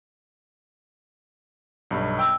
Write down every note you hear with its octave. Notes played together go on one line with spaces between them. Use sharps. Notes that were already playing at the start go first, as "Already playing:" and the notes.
B1 G2
G5 E6